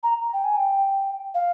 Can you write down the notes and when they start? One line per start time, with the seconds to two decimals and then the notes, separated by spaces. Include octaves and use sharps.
0.03 A#5
0.33 G5
0.44 G#5
0.56 G5
1.34 F5